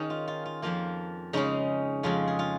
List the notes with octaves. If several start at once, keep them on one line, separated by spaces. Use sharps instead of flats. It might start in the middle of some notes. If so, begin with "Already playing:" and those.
Already playing: D#3 C#4 D#4 G#4
F4
F4
F4
F2 F3 A#3 F4
C#3 G#3 C#4 D#4
F2 C#3 F3 G#3 F4
G#4
F4